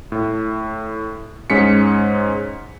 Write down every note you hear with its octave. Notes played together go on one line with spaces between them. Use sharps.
A2
G#2 G#3 C#4 B6 C#7